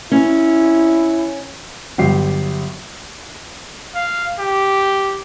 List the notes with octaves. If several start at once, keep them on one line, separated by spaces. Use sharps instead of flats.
C#4 E4
G1 F#3 G4 C7
F5
G4